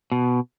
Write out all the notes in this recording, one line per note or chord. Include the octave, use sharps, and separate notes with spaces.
B2